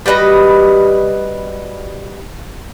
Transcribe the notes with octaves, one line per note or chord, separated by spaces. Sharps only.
G3 F#4 B4 D#5